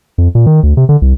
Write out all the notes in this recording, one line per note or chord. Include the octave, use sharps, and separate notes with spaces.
F2
A#2
D#3
D2
C3
D3
C2